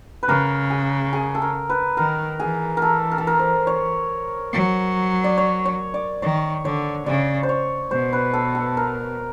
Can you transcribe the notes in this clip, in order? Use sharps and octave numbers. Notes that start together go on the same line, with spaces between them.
B4
C#3 A#4
G#4
G#4
A4
A#4
B4
D#3 A#4
E3 G#4
A4 A#4
A#4
A4
A#4
C5
C#5
F#3
D5
C#5
C#5
D5
D#3 C#5
D3 C#5
C#3 D5
C5
C#5
B2 C5
B4
A4
A4
A#4